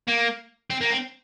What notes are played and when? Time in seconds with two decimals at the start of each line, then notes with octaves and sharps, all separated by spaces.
0.08 A#3
0.70 C4
0.81 A#3
0.91 C4